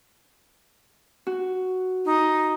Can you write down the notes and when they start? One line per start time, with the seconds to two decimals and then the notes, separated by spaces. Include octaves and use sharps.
1.27 F#4
2.05 D#4